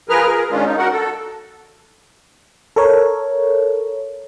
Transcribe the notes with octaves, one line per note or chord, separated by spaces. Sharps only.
F3 G#4 A#4 B4 F6
G#4 A#4
D#3 G#3 C#4 D4 F4
D#4
F#4 A#4 F#5
A4
A4 A#4 C#5